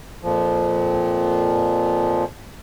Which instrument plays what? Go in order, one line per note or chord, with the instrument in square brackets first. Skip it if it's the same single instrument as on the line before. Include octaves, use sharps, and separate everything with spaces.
[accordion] F2 A#2 F3